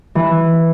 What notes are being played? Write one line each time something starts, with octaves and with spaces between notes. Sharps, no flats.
E3